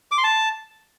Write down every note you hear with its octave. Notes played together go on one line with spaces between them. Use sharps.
D6
C6
A5